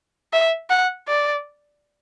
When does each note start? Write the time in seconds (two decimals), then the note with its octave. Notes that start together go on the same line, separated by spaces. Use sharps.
0.33 E5
0.70 F#5
1.08 D5